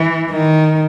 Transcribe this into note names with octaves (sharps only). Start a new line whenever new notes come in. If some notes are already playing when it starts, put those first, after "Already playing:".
Already playing: E3
D#3